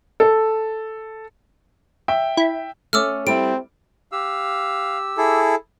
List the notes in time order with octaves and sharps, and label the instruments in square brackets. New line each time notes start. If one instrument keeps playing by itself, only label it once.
[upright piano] A4
[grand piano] E5 G5
[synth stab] E4
[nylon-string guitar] A3 C#4 [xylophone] D6 E6 F6
[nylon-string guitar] G3 E4 [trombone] C4 [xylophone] D7
[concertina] G4 E6 [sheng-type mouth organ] F5
[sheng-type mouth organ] E4 G#4 A4